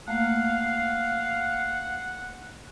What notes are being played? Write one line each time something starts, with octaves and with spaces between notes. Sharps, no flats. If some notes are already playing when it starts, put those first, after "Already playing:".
A3 A#3 F5 F#5